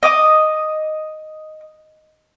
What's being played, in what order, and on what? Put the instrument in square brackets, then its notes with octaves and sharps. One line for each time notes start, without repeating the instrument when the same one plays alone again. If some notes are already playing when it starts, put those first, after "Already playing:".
[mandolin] D#5 D6 D#6